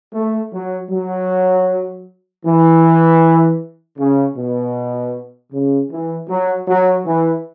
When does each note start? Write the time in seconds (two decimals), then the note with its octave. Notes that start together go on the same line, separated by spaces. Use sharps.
0.13 A3
0.52 F#3
0.90 F#3
2.45 E3
3.98 C#3
4.36 B2
5.52 C#3
5.90 E3
6.29 F#3
6.67 F#3
7.06 E3